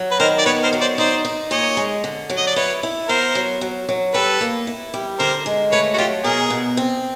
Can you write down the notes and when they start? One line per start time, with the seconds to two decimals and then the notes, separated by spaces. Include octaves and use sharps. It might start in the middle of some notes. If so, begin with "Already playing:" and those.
Already playing: F#3
0.11 B4
0.20 D#3 A#4 C5
0.39 D5
0.45 B3 B4 C#5
0.63 A#4 C5
0.73 F#3
0.81 C5 D5
0.98 D#4 C5 D5
1.25 D#4
1.51 A#2 C#5 D#5
1.77 G#3
2.04 D3
2.30 F#3
2.37 D#5
2.47 D5
2.56 E4 B4 C#5
2.83 E4
3.08 B3 A#4 C5
3.35 F#3
3.61 F#3
3.89 F#3
4.14 G3 A4 B4
4.41 A#3
4.67 E4
4.94 G3
5.19 D3 A#4 C5
5.46 G#3
5.72 A3 B4 C#5
5.94 F#4
5.98 F#3 F4 G4
6.24 B2 G#4 A#4
6.50 B2
6.77 C4